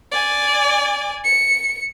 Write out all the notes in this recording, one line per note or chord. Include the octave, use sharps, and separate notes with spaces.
D5 G#5
C#7